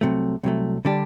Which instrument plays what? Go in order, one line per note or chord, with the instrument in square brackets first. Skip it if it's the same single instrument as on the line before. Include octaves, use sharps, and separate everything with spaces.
[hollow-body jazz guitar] C2 C3 F#3 A3
C2 C3 F#3 A3
D3 G3 D4 G4